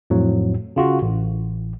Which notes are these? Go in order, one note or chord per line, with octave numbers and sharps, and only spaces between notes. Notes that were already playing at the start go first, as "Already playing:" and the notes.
F2 A2 F#3
C#3 F4 F#4
A1